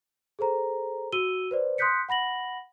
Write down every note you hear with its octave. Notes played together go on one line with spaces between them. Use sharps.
G#4 A4 C5 A#5
F#4 E6 D#7 G7
B4 C5 D5
C6 D#6 F#6 G6 B6 C#7
F#5 B5 A#6 F#7